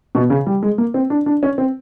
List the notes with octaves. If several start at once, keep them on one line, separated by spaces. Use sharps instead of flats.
B2
C#3
G3
G#3
A#3
C4
D4
D4
C#4
C4